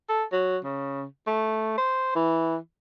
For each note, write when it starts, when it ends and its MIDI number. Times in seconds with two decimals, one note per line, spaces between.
0.09 0.24 69
0.32 0.58 54
0.64 1.04 49
1.27 1.77 57
1.78 2.15 72
2.16 2.56 52